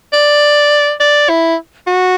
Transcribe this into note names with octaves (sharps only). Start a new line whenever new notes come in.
D5
D5
E4
F#4